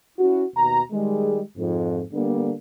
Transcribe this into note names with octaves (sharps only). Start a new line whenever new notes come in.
C#4 E4 F#4
D#2 B2 A#5
D#3 G3 G#3
F2 G#2
D3 G3 A#3 B3 D4